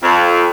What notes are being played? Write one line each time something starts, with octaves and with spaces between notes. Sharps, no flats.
F2